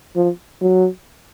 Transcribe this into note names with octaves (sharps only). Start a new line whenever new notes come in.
F3
F#3